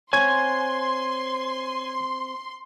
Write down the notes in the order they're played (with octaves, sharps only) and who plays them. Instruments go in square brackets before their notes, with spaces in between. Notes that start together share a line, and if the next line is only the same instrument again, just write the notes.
[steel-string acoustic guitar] C4 C5 F#5 [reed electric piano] C#5 G#6 [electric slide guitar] G#5 [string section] C6